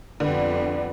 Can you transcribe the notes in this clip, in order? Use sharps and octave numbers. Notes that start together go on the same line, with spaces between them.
F2 D3 G3 B3